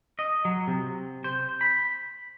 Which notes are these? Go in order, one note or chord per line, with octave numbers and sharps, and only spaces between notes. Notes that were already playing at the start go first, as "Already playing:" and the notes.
D#5
F#3
C3
C5
B5